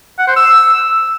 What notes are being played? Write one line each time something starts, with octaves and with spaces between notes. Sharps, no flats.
F#5
C5
E6